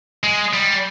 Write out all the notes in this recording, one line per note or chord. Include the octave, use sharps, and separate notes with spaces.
G#3
G3